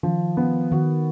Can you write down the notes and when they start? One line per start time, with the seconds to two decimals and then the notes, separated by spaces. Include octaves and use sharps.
0.03 D#3 F3
0.37 B3
0.72 D#3 F#4